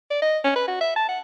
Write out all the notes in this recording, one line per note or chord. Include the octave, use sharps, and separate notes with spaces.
D5
D#5
C#4
B4
F#4
E5
A5
F#5